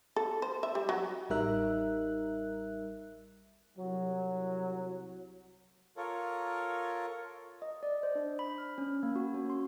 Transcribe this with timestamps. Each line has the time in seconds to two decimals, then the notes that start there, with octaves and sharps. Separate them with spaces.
0.16 A4
0.42 C5
0.63 E5
0.75 G3
0.89 F#3
1.30 A1 G3 D#4 A#4 E5 F#6
3.77 C2 F#3
5.97 F4 A4 A#4 C#5
7.62 D#5
7.83 D5
8.03 C5
8.15 D4
8.39 B5
8.58 F6
8.78 C#4
9.03 A#3
9.16 F#4
9.34 C#4
9.50 C6